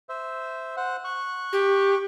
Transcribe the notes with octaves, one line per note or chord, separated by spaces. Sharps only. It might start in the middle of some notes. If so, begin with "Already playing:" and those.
C5 E5
C5 F#5
C#6 F#6
G4